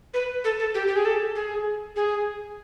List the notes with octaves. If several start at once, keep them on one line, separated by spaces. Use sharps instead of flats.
B4
A4
A4
G4
G4
G#4
A4
G#4
G#4